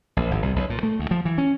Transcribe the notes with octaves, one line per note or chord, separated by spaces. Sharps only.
A#1
G#1
C2
B1
A#2
A3
D2
F3
E3
C#4